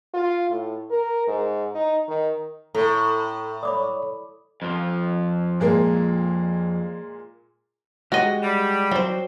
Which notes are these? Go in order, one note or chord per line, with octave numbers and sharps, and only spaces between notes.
F4
A2
A#4
G#2
D#4
D#3
A2 A4 A#5 C#6
C#5 D5 B5 D6 D#6
F2 F3
A#2 G#3 A#3
G#3 F#4 G4 D#5
G3
F#3 C4 C5